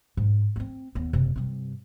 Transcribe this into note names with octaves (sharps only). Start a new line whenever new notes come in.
G#2
B3 C4
D#2 B3
F#1 C3
G2 C3